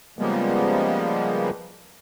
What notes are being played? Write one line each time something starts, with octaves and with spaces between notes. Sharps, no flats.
C#3 F3 G3 G#3 A#3 B3